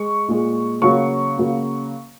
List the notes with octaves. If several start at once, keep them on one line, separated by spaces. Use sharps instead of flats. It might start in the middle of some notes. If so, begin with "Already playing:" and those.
Already playing: G#3 C#6
A#2 G#3
C#3 F#3 A#3 C#6
C#3 F#3 A#3